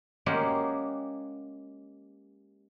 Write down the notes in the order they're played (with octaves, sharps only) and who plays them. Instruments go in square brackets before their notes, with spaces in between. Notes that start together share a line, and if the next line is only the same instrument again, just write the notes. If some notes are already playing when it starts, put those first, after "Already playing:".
[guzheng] G#3 A#3 C#4 G4 F#5